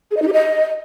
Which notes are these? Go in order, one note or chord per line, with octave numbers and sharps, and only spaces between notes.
G#4
D#5
D#4
G4
D#5